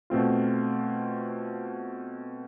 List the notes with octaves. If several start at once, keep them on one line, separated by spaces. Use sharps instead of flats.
B2 A3 C4 F4